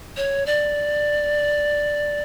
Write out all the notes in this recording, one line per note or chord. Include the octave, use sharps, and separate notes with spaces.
C#5
D5